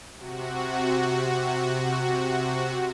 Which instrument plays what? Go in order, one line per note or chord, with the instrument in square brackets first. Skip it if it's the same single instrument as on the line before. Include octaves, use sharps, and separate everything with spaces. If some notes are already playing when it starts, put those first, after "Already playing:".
[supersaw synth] C3 F#4